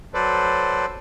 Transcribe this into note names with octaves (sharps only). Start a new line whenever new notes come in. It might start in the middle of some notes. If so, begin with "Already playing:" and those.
F#3 A4 B4 C5 D5